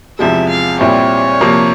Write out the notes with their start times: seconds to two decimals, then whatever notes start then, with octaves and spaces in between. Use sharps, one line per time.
0.19 E2 C3 F3 G#3 E5
0.49 F5
0.80 A#2 G3 C4 E4 G4 C#5
1.41 C3 F3 A#3